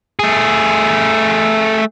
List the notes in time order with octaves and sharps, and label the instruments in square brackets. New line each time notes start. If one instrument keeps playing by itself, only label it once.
[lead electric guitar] A3 G#4